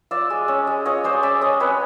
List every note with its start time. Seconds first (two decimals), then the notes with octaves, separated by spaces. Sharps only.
0.11 F4 D5 E5
0.30 G#3
0.48 C#4
0.67 G#3
0.85 F4 C#5 D#5
1.04 G#3 C5 D5
1.23 C#4 D5 E5
1.41 G#3 C#5 D#5
1.60 C4 B4 C#5